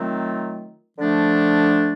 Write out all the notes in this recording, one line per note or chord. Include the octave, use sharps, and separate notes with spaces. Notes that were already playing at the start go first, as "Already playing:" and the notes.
Already playing: D#3 F#3 A3 C4 F4
D3 F3 A3 D4